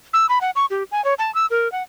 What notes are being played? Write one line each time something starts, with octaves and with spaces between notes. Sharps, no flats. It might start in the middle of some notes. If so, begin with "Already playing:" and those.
E6
B5
F#5
C#6
G4
G#5
C#5
A5
E6
A#4
F#5